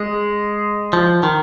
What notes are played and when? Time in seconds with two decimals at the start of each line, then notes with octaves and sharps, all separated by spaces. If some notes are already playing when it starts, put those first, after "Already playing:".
Already playing: G#3
0.93 F3
1.23 D#3